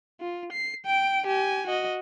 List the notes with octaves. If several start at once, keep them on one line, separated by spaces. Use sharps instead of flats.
F4
C7
G5 D7
G4 G#5
F#4 D#5